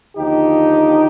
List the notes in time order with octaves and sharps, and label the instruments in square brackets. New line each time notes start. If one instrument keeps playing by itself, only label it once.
[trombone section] D#2 D3 F3 D#4 G4